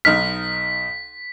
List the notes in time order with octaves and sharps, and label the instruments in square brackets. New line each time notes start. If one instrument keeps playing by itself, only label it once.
[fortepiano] B1 D#4 F6 [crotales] B6